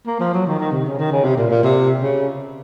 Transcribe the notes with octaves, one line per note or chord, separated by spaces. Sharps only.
A#3
F3
F#3
D#3
D#3
C3
C#3
D#3
C#3
C3
A#2
A#2
C3
C#3